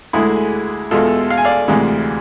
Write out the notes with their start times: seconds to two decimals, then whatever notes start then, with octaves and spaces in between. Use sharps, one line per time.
0.13 D2 D3 G#3 E4 G#4
0.91 E2 B2 G#3 F4 A4
1.30 F5
1.37 G#5
1.45 D5 F5
1.68 D2 C3 E3 G#3